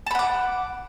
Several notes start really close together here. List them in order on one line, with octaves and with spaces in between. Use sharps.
A5 B5 F#5 D6